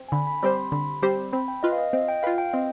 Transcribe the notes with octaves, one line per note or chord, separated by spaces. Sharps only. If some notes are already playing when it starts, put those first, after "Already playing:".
Already playing: C4
G#5
D3 B5
B5
G3 C4 G4 C5 B5
C6
D3 B5
G3 C4 G4 C5
C4 B5
G5
F4 B4 D#5
F5
D#5
C4 D#5
G5
F4 B4 F5
G5
C4 D#5